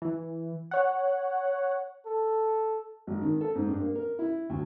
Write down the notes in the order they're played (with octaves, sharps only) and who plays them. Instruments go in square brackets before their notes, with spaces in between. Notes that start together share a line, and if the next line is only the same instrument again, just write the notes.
[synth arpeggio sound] E3
C#5 F#5
[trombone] A4
[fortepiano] G#1
D#3
A4
G#2
G2
A#3
A#4
E4
D2